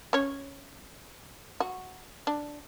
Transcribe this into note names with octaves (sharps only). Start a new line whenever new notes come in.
C#4 C#5
F#4
D4